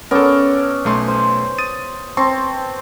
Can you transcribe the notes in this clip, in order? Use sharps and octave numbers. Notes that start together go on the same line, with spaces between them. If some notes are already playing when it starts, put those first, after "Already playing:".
B3 C#4 A4 A#4 D5
B1 A3 C6
C5
D#6 A6 D#7
C4 A5 C6 C#6